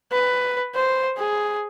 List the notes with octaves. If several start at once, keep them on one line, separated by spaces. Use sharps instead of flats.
B4
C5
G#4